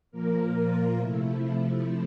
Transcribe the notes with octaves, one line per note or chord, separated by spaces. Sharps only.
A#2 F3 A#3 A#4
F4
C3 F3 A3 E4
E4